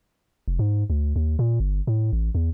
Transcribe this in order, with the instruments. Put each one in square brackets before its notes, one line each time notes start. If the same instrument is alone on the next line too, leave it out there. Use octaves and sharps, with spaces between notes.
[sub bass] F1
G#2
D2
D#2
A#2
G1
A2
A1
E2